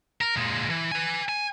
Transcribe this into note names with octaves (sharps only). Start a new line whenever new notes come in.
A#4
A#2 G#3
E3
B4 G#5
G#5